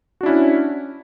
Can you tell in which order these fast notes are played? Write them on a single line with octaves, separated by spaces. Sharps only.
F#4 D4 E4 C#4